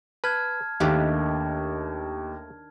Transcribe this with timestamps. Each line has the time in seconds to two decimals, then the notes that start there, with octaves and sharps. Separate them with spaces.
0.24 B4 A5 F6 G#6
0.80 D#2 D#3 A3 D4 G4 B4 F5